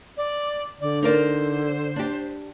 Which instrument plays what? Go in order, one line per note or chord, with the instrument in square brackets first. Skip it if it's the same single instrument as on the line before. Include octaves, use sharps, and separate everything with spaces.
[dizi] D5
[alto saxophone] D3 [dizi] D5
[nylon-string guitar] D#4 A#4 D5 [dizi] C5
[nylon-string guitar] D4 G4